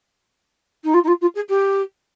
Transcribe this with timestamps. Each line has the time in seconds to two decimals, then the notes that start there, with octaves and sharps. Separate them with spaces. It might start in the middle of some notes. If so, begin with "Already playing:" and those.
0.84 D#4
0.94 F4
1.04 D#4
1.08 F4
1.21 F4
1.35 G#4
1.49 G4